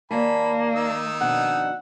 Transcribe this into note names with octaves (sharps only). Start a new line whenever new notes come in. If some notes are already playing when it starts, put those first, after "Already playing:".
D#2 A#3 D5 G#5 A5 B5
D#3 D#4 E6
F2 B2 D4 F#5